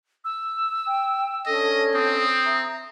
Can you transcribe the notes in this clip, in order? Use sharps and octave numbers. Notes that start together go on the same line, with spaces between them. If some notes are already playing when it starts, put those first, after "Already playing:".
E6
G5
C#4 D4 A4 D#5
C4 D#6
E5 A#5